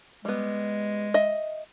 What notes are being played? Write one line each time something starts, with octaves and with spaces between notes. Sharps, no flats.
G3 G#3 B3
D#5 E5